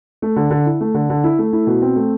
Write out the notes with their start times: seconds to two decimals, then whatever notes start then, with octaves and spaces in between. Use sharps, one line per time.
0.22 A3
0.36 D3
0.51 D3
0.66 E4
0.81 A3
0.94 D3
1.10 D3
1.24 E4
1.39 A3
1.53 E4
1.67 B2
1.82 C4
1.96 A3